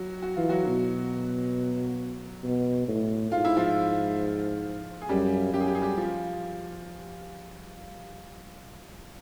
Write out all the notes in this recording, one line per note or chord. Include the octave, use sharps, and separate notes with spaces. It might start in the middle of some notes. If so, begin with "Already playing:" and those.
Already playing: F#3 F#4
F#4
E3 F4
F#3 F#4
B2
B2
A2
G#2 F4
E4
F3 F4
G#4
F#2 G3 G4
F#2 G4
G#4
G4
G#4
G3 G4
F3 F4